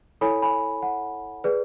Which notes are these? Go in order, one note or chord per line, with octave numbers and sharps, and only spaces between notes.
E4 A4 C#5 G#5 B5
G#5 B5
F#5
G#4 B4 D5